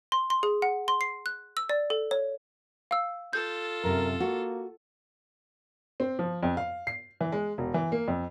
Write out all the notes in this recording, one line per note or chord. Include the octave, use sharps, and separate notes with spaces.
C6
C6
G#4
F#5
C6
C7
F#6
E6
D5
A4
C#5
F5 E6
F4 A4 G6
F#2 C3 A#4
A#3 F#4
C4
F3
F2
F5
C7
E3
G#3
E1
E3
A#3
F2